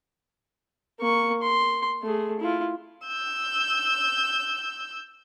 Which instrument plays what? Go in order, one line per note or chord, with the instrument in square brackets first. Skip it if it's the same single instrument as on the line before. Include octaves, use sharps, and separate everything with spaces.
[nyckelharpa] A#3 C#6
C6
A3 G#4
E4 F4
[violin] E6 G6